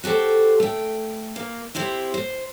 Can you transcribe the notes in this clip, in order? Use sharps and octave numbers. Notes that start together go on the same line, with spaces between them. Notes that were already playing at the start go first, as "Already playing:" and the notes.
F#4 G4 A4 C5
A3 G5
A#3
C4 E4 G4 C5
C5